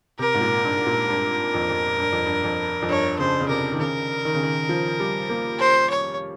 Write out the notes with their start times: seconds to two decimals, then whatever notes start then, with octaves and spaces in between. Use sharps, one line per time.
0.19 C3 A#4
0.34 G#2
0.41 A#2
0.65 G2
0.86 A#2
1.09 G2
1.54 F2
1.69 F2
1.99 G2
2.12 F2
2.26 G2
2.44 F2
2.82 F2
2.89 G2 C#5
3.19 C#3 C5
3.40 C#3
3.49 C3 A#4
3.72 D#3
3.80 C#3 A#4
4.25 D#3
4.34 C#3
4.43 D#3
4.69 F3
5.00 G3
5.29 A#3
5.59 C5
5.90 C#5